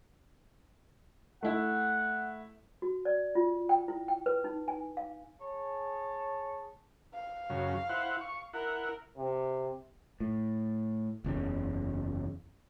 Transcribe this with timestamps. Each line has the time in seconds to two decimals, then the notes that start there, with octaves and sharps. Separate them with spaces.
1.43 A3 E4 F#5
2.82 F#4
3.05 D5
3.35 F4
3.69 G5
3.88 E4
4.08 G5
4.26 B4
4.44 D#4
4.68 G#5
4.97 F5
5.40 G#4 C#5 A5
7.14 F5
7.50 F#2 C#3
7.89 E4 C5 F#5
8.21 C#6
8.54 E4 A#4 F#5
9.18 C3
10.20 A2
11.24 F#1 E2 C#3